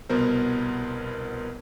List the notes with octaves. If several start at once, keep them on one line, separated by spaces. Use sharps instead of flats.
C2 B2 B3 A#4 C5